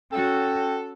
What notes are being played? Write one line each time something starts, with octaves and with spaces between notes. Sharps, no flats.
C#4 F#4 A4 G5